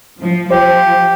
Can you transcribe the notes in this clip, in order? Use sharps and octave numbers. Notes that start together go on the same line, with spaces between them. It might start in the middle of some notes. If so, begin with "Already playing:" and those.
F3
F3 G4 C5